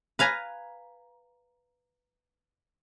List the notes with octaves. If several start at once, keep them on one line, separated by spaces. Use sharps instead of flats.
B4 F5 G#5 A#5